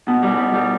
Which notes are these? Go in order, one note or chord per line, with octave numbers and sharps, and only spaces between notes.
B2
G3
B2
G3